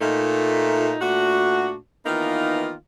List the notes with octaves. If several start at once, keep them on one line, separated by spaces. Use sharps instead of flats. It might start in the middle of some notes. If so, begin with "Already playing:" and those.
A#2 A3 D#4
A#2 A3 D4 F#4
D#3 E3 A#3 B3 D#4 F4